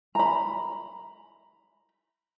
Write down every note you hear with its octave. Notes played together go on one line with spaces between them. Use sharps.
A#5 B5